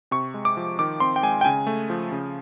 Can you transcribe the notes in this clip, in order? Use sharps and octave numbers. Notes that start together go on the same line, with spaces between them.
C3 C#6
G#3
D6
F3
D#3 D6
C4 C6
G5
G#3 G#5
G5
C#3 G#5
A3
F3
C#3